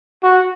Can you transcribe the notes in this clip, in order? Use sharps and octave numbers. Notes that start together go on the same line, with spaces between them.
F#4